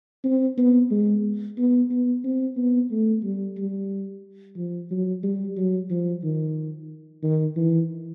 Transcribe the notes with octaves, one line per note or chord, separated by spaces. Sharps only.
C4
B3
G#3
B3
B3
C4
B3
A3
G3
G3
F3
F#3
G3
F#3
F3
D#3
D#3
E3